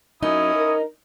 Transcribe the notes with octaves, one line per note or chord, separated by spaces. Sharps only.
F#2 C#4 D#4 E4 D#6
A#4